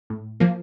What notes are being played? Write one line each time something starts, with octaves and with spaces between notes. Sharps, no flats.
A2
F3 A#3